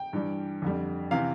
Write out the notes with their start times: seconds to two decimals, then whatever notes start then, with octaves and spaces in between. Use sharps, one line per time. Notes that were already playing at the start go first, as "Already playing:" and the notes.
Already playing: G5
0.13 G2 E3 G3
0.62 F2 D3 G3
1.11 C3 E3 F5